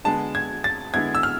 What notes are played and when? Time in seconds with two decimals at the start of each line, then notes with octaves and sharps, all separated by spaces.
0.04 D3 G#3 B3 A5
0.35 G#6
0.64 A6
0.94 D3 G#3 B3 E4 G#6
1.15 E6
1.23 F6